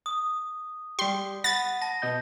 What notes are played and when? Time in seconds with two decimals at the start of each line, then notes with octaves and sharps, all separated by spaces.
0.06 D#6
0.99 G3 G4 C6
1.44 F#5 B5 A6
1.82 A5 A#6
2.02 B2 D#5 G6